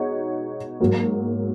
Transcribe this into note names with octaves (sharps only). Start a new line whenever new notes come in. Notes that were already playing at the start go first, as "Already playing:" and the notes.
Already playing: B2 G#3 D#4 F#4 C#5
G#2 F#3 A#3